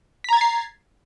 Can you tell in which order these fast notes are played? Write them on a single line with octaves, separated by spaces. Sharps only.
B6 A#5 G#6 A6 C7